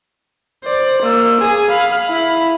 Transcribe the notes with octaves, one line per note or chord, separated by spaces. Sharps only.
C5 D5
A#3 E6
G#4 G#5
F5 B5
E4 B5